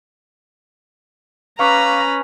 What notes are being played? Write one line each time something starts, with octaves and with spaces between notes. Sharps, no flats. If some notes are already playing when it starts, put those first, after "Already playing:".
C#4 B4 F5 A#5 C#6 D6